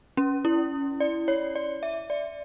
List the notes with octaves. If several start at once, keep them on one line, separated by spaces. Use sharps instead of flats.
C#4
E4
D5
C#5
D5
E5
D5